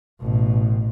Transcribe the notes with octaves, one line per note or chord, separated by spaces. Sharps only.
A1 B2